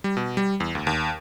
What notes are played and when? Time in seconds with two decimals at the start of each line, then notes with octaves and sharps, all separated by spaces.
0.04 G3
0.17 B2
0.37 G3
0.60 E2
0.75 D2
0.87 D#2